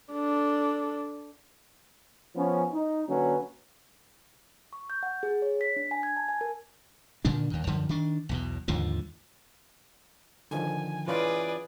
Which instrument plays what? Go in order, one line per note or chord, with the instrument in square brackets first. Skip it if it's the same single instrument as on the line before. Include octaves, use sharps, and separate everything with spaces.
[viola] D4 A4
[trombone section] F3 B3 C#4
D#4
D3 F#3 A#3 C#4 B4
[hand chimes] C#6
G6
F#5
G#4
C#5
B6
D4
G#5
G#6
A5
G#5
A#4
[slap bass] A#2 D3 D#3 D4
D#2 D#3
F#2 D3 F3
D#3 D4
B1 E2 B2
D#2 G#2 D3 F3
[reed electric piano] D3 D#3 F3 [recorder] G#5
[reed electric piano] E3 C#4 F4 [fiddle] G#4 B4 [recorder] D5